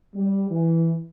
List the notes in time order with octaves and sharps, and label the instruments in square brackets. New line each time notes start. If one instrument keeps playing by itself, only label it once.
[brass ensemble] G3
E3